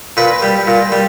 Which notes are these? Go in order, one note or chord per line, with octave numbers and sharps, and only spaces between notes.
A#2 B4
G3
A#2
G3